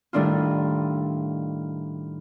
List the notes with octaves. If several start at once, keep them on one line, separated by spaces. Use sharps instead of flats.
A2 D#3 G3 D4 E4 F4